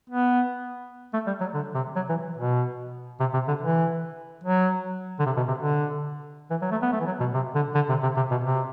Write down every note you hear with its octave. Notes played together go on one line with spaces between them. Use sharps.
B3
A3
G3
F#3
D3
C3
F#3
E3
B2
C3
C3
D3
E3
F#3
D3
C3
B2
C3
D3
E3
F#3
A3
B3
A3
E3
F#3
B2
C3
D3
D3
C3
C3
C3
B2
C3